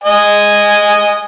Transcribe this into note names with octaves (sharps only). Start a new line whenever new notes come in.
D#5 G#5